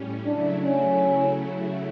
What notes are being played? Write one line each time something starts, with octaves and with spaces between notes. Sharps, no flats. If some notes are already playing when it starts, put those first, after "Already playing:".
Already playing: A2 G3 C#4
C#3 F#3 A3 D4 E4
C#4